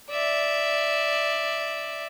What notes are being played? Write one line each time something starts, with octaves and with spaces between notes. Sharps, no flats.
D5 E5